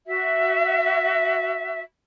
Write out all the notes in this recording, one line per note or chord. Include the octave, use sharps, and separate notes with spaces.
F#4 E5